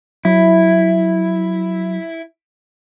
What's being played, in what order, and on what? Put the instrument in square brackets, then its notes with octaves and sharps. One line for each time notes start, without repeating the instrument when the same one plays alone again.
[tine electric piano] F#3 [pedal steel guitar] E4